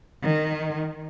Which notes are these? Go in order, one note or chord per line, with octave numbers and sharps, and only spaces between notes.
D#3